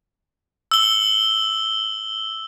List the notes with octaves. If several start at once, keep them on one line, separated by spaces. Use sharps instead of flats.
E6 G7